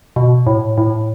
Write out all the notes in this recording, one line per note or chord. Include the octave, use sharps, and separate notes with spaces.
B2
A2
A2